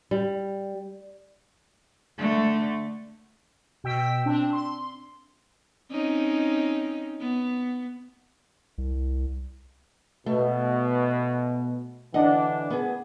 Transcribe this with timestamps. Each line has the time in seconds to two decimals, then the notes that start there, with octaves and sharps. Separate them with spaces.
0.11 G3
2.18 D3 A3
3.84 B2 G5 E6 B6
4.26 C4 D4
4.53 C6
5.91 C4 C#4 D#4
7.20 B3
8.78 C2
10.26 B2 A3
12.14 D3 E3 D4 D#5 F#5
12.70 B3 G#4